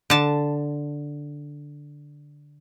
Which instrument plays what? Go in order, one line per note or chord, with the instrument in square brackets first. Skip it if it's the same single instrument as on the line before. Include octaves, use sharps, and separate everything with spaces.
[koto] D3 A5